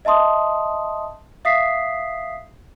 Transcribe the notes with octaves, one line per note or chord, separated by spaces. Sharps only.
D#5 E5 A5 C6 D#6
E5 F5 D#6 B6 C7